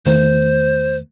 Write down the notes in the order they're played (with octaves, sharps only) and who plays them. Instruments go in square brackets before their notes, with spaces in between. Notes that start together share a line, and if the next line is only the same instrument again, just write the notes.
[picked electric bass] E2 D#3 A3 [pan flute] C5